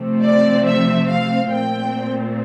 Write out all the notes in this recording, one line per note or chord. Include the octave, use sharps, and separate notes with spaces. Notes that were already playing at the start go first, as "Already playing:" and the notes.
Already playing: C3 F3 A3 C4
D5
E5
F5
A#2 A3 C4 G5